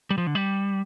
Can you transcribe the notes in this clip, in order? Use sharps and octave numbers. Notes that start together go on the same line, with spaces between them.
G3
F3
D3
G3